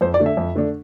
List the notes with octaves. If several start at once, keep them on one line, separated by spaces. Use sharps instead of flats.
F2 C5
D5
D3 A3 D4
E5
F2
D3 A3 D4